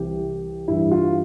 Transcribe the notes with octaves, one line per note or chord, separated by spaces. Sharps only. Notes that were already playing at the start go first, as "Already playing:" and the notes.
Already playing: C2 C3 E3 G4
G2 E3 E4
F4